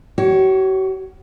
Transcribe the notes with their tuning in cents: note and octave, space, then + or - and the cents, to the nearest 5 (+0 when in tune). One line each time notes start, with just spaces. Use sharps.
F#4 +45 C#5 +0